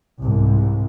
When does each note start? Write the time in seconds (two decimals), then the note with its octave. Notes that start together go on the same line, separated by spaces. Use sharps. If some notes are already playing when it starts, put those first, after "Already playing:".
0.21 C2 G#2